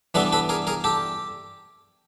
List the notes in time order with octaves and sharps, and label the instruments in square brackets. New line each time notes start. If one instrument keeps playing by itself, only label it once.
[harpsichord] E3 G3 B3 D4 A4 B4
A4 B4
G#4 A#4
G#4 A#4
G4 A4